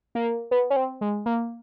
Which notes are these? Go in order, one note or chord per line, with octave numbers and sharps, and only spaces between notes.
A#3
B3
C#4
C4
G#3
A#3